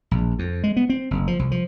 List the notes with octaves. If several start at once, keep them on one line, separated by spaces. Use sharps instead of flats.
A#1
F2
G#3
B3
C4
F#1
F3
C2
F3